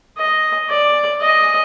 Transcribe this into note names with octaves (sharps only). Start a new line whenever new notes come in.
D#5
D5
D#5